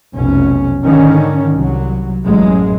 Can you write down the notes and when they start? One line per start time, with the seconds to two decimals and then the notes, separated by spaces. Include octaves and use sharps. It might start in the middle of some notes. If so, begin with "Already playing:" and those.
0.14 F1 B1 C#4
0.83 G#2 D3 D#3 C#4
1.52 C2 F#3
2.24 A1 F#2 F#3 G#3